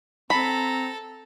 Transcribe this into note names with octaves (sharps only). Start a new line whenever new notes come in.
C4 A4 A#5 B5